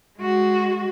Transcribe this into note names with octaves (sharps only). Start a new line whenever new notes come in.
G#3 F#4